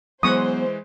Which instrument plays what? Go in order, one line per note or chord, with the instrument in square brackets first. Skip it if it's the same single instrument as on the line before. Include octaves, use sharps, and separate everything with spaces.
[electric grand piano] E3 G#3 F#6 [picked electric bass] F#3 B3 [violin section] C5 [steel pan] C#6 D#6